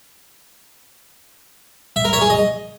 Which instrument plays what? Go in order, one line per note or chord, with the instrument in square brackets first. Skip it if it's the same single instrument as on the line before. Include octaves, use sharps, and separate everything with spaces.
[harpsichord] E5
A#4
C#5
G#4
D#5